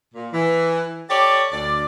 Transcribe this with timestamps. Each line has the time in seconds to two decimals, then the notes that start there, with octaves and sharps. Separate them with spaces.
0.14 A#2
0.33 E3
1.10 G4 A4 C#5 D5
1.52 D2 D5